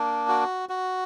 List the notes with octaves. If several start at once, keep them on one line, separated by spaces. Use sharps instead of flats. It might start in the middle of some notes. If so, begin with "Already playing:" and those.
Already playing: A#3 D4
F#4
F#4